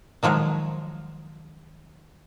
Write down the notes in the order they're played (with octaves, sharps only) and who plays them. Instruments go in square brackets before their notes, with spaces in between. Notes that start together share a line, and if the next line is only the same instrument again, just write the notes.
[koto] D#3 F3 F#3 G#3